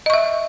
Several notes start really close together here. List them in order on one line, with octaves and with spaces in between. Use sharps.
D#5 C#6 E5